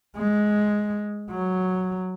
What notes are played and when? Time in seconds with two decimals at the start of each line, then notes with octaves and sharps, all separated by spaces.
0.16 G#3
1.30 F#3